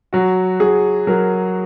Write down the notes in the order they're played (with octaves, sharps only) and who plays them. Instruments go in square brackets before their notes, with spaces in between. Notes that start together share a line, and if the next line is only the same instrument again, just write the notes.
[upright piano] F#3 F#4
F#3 G#4
F#3 A#4